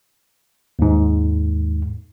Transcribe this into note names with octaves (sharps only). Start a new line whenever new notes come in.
D#2 G#2